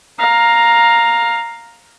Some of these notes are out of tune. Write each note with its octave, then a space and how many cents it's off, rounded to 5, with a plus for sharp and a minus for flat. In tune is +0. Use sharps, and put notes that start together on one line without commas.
F5 +10 A#5 +0